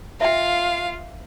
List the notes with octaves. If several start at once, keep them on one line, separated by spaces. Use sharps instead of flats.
F4 E5 F5 G5